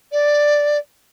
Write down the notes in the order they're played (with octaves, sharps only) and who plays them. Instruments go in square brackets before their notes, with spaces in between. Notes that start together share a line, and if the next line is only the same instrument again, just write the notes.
[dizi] D5